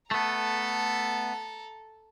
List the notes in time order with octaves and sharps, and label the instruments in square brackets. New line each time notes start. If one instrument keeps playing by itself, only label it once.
[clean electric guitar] A3 B3 [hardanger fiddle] A4 A#5